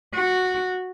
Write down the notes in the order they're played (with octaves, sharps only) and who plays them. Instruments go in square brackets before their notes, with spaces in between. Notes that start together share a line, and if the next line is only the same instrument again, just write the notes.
[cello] F#4